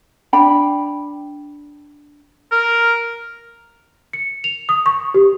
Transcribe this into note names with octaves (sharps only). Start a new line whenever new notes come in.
D4 G5 B5
A#4
C#7
F7
D#6
C#6
G4